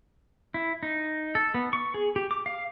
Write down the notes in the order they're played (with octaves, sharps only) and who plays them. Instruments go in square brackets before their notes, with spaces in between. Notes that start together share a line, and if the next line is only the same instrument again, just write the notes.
[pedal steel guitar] E4
D#4
A4
B3
C#6
G#4
G4
D6
F5